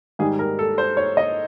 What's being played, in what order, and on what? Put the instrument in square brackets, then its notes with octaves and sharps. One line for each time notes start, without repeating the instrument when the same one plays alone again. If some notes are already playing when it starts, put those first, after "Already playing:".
[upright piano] G#2 D#3 G3 G#4
A#4
A4
C5
C#5
D#5